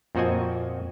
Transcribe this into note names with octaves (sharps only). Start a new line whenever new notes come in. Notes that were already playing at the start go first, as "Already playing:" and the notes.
F2 A#2 C4 F#4 D#5 G#5